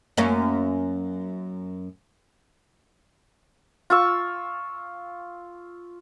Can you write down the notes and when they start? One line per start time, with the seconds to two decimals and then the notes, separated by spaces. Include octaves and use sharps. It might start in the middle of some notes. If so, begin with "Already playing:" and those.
0.17 F#2 A#3 C#4
3.90 F4 C#6 E6